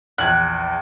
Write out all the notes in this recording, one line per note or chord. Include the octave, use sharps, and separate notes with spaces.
A#1 E2 F#6 G#6